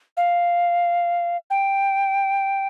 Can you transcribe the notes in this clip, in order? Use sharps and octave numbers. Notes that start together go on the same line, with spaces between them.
F5
G5